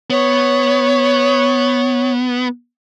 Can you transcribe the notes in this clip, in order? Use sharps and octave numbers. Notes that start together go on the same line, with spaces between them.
B3 C#5